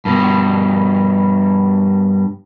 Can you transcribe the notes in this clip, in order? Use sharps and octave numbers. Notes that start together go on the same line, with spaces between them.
G2 B2